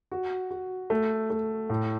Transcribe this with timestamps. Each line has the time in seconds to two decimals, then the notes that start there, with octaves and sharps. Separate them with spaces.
0.11 F#4
0.50 F#4
0.90 A3
1.30 A3
1.70 A2